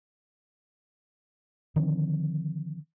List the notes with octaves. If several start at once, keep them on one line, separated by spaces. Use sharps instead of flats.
D3 D#3 F3 C4